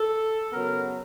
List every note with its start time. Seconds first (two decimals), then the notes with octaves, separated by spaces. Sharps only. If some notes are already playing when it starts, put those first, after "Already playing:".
Already playing: A4
0.51 C#3 F#3 B3 A#4